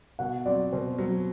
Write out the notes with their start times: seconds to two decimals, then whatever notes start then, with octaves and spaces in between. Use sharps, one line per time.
0.19 B2 F#5
0.45 F#3 C4 D5
0.72 B2 C5
0.98 F#3 C4